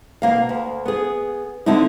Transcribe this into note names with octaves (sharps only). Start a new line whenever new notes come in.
B2 A#3 F5
D2
B3 G#4
D3 A3 C4 D#4 E4